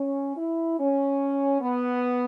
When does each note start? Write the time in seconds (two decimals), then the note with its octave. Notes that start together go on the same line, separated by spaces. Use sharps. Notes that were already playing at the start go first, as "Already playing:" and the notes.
Already playing: C#4
0.35 E4
0.77 C#4
1.60 B3